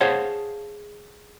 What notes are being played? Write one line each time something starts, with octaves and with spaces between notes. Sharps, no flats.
G#4 C5 C#5 F5 F#5 A5